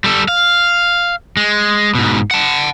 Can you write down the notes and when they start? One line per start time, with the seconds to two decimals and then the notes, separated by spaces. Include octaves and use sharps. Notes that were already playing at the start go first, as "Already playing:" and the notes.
0.04 G3 A4
0.28 F5
1.37 G#3
1.95 G#2 B2
2.31 F#5 A5